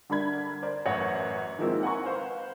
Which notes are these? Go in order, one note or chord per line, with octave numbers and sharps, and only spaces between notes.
D3 G3 D4 A#4 B5 G#6
A#4 C5 D5
A1 F#2 C#5 F#5 A#6 C#7
D#3 F3 G#3 A#3 C4 E4
F#5 G#5 A#5 C#6
B4 C5 F5 F#5